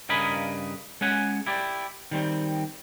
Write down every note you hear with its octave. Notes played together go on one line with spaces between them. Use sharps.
G2 C#3 A#4 D#5 G#5 B5
G#3 C#4 F#5 G#5
E4 G4 D5
D#3 G3 C4